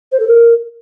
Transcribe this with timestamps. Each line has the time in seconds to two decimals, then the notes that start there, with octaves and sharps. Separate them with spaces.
0.12 C5
0.20 A4
0.27 A#4